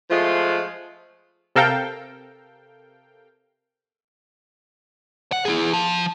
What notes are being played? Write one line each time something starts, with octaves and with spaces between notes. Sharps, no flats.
F3 G#3 A3 F4
C3 A4 A#4 F5 G5
F#5
E4 G#4
F3